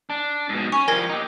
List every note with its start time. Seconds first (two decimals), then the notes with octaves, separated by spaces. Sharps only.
0.10 D4
0.49 G#2 B2
0.72 C#4 C#6
0.88 F3 G3 A#4 G#6 A#6
1.09 D#4 G4